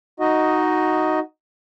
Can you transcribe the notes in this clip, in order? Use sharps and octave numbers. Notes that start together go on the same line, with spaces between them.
D#4 F#4 D#5